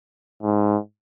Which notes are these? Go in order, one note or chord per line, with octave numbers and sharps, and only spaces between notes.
G#2